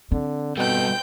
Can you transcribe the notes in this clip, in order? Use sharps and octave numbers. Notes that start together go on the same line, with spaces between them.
D3 C4
B2 G3 B3 A4 G5 G6